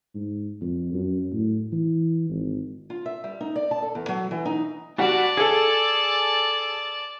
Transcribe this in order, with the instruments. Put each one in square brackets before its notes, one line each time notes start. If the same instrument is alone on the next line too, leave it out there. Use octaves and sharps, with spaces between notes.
[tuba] G#2
F2
F#2
A2
E3
G#1
[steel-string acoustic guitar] F4
E5
G3
D#4
D5
A5
A4
E2
F#3
E3
D#4
[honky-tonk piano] G3 F#4 [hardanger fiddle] D5 A5
[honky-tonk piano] G#4 A4